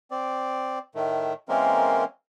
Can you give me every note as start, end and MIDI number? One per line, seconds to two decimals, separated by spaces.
0.11 0.79 60
0.11 0.79 74
0.95 1.33 45
0.95 1.33 51
0.95 1.33 57
1.49 2.04 52
1.49 2.04 56
1.49 2.04 58
1.49 2.04 60
1.49 2.04 61
1.49 2.04 70